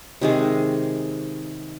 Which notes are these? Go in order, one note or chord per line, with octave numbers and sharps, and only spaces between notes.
C3 D#3 G#3